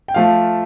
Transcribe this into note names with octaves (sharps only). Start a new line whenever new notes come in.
G5
F3 A3 F5